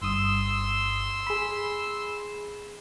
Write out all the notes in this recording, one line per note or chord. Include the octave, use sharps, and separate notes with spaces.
G1 G2 C6 D#6 E6
G#4 B5